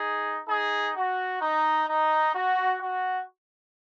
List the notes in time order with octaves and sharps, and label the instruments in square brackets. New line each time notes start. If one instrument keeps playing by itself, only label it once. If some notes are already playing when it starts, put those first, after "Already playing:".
Already playing: [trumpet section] D#4 G#4
D#4 G#4
F#4
D#4
D#4
F#4
F#4